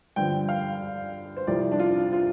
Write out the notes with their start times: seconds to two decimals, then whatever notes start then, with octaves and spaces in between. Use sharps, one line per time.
0.16 G2 D3 F3 G5
0.49 F5
1.37 C5
1.47 C2 C3 F3 D5
1.72 D4
1.79 F4
2.13 F4